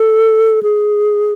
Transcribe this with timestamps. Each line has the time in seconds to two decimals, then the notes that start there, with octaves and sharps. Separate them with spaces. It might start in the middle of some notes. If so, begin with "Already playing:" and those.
Already playing: A4
0.63 G#4